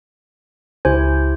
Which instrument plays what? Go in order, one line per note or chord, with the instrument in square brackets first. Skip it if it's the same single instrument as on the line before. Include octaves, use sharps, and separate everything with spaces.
[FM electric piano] C#2 G#5 [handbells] E4 G4 C5